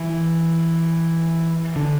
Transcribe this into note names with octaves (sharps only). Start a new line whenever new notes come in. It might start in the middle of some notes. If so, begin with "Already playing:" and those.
Already playing: E3
D3